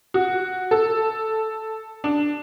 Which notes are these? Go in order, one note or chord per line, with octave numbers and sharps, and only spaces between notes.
F#4
A4
D4